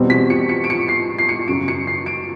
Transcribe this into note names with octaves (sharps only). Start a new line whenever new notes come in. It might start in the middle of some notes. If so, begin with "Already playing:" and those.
Already playing: E2 B2 G3 C4
B6
C#7
C#7
D7
C#7
C7
C7
C#7
F#2 C#3 F#3 D7
C#7
C7
D7